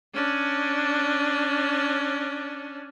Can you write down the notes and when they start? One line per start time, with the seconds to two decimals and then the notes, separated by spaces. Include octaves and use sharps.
0.14 C#4 D4